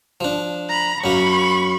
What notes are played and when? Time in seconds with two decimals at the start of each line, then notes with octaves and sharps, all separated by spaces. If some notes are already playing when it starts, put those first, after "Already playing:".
0.21 F3 D4
0.69 A#5 B5
1.04 F#2 A#3 B5 C#6